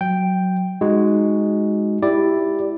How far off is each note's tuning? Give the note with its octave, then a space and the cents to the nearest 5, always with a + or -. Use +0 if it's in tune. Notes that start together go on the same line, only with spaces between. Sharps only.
F#3 +0 G5 +0
G#3 +0 D#4 +0 F#4 +0
E4 +0 G4 +0 D5 +0